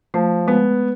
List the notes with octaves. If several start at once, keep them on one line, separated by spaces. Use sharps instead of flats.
F3 A3
G#3 B3